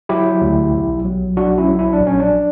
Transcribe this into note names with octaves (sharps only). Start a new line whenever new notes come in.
F#3 E4 G4
D2
B1
F#3
B1 D4 F#4
C#4 E4
F#3
E4
D4
A#1
C#4
D4